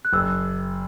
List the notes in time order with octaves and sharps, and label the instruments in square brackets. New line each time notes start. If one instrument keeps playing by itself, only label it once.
[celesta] F#6
[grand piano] F#1 [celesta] E6